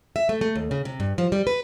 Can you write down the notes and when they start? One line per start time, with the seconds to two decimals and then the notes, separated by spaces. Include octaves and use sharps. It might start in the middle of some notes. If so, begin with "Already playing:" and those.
0.16 E5
0.29 A3
0.41 A3
0.56 D#2
0.71 C#3
0.85 C3
1.00 G2
1.18 F3
1.32 G3
1.47 B4